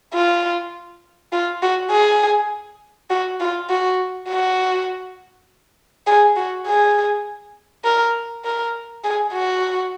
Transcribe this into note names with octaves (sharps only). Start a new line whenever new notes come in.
F4
F4
F#4
G#4
F#4
F4
F#4
F#4
G#4
F#4
G#4
A#4
A#4
G#4
F#4